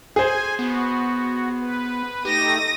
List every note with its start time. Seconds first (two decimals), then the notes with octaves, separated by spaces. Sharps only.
0.16 G#4 C5 G#5
0.59 B3 F#4
1.59 B4
2.25 A3 D#4 G4 D#6 A#6